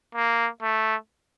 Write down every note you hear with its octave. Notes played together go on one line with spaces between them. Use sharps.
A#3
A3